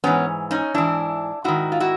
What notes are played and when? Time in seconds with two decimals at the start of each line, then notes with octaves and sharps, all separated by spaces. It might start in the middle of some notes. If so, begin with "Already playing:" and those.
0.04 G#2 E3 B3 C#4
0.51 C#4 D#4
0.74 G#2 E3 D4 E4
1.44 G#2 D#3 E4 F#4
1.72 F4
1.80 E4 F#4